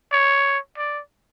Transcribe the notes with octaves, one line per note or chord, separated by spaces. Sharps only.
C#5
D5